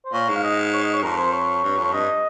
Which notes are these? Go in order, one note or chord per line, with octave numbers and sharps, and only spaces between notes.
C5
A#2 C#5
G#2
F5
D#5
C#5
D#5
C#5
F2 A#4
C5
C#5
G2
F2
C#5
G2 D#5